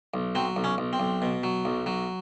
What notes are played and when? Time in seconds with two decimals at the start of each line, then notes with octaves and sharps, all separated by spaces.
0.14 B1
0.35 F#3 C4
0.56 B1
0.64 C#4
0.78 B1
0.93 C4
1.00 B1
1.22 B2
1.43 F#3
1.65 B1
1.86 F#3